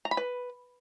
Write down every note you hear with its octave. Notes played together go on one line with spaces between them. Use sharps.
A#5
B5
B4